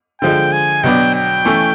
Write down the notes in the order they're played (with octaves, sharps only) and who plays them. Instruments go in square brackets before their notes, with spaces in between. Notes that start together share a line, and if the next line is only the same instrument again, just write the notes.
[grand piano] D3 F3 G#3 [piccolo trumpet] G5
[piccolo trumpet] G#5
[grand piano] B2 F#3 B3 D4 [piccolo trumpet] G5
[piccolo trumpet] G5
[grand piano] E3 A3 C#4